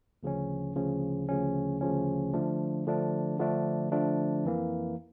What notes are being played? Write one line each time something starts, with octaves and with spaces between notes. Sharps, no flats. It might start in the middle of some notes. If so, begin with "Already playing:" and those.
D2 C#3 F3 C#4
D2 C#3 F3 C#4
D2 C#3 F3 C#4
D2 C#3 F3 C#4
D3 F3 A3 D4
D3 F3 A3 D4
D3 F3 A3 D4
D3 F3 A3 D4
F2 E3 A#3